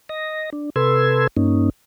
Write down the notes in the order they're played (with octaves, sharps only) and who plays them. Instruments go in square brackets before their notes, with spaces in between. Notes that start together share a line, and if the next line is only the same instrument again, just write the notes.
[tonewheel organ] D#5 A#6
D4
C3 A4 B4 C6 E6 G#6
G2 A#3 C#4 D#4